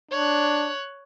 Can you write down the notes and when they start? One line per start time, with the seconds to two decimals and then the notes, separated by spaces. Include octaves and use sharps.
0.11 D4 C#5 F#6